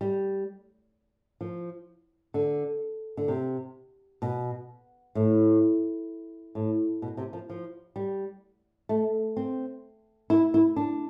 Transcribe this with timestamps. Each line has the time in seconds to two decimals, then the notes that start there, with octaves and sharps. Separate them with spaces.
0.01 G3
1.41 F3
2.34 D3
3.17 D3
3.28 C3
4.22 B2
5.15 A2
6.55 A2
7.02 B2
7.17 C3
7.33 F3
7.50 F3
7.96 G3
8.89 A3
9.37 C4
10.30 E4
10.54 E4
10.76 D4